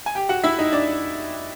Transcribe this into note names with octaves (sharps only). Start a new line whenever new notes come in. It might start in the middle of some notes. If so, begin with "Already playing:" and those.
G#5
G4 G5
F#4 F#5
E4 E5
D#4 D#5
D4 D5